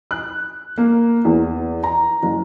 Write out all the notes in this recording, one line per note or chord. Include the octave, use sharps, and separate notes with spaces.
F#6
A#3
E2
A#5
F#1